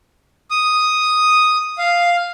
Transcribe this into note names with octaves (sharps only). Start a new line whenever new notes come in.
D#6
F5